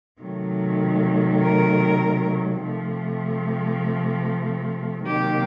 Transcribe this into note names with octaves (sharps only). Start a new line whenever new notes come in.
C3 D#3 F#3 A3
A#4
C3 F3 A3
C3 D#3 F#3 A#3 G4